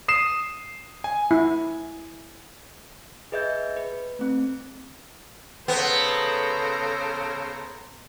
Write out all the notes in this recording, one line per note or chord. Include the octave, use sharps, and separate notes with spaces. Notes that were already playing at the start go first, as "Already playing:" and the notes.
D#6 C7 E7
G#5
E4
G#4 B4 D#5 E5 G6
B4
A3 C4
C#3 B3 A4 C5 A#5